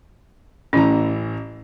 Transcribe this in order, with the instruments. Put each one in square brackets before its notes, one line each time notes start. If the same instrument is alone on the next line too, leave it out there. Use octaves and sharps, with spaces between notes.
[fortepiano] A1 E3 A#5 [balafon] C#4